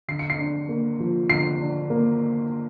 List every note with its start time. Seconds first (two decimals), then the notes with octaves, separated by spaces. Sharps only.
0.08 D3 C7
0.19 C#7
0.30 C7
0.39 D4
0.69 A#3
1.00 F3
1.29 D3 C7
1.60 D4
1.90 A#3